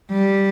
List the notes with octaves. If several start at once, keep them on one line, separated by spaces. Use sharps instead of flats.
G3